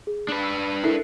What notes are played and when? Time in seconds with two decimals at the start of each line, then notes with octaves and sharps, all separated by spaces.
0.07 G#4
0.29 D4 B4
0.43 E6
0.84 E4 A4 A#4 C7